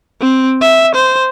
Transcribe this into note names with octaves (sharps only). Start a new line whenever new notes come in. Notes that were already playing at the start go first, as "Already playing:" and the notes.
C4
E5
C5